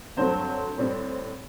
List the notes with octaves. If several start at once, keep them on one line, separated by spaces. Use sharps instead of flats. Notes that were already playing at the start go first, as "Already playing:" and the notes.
G2 F#3 A3 C4 C5
A2 G3 C4